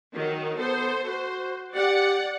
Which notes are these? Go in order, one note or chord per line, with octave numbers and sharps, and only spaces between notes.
D#3 F#3
B3 A4 C5
F#4 C5
G4 D5 F#5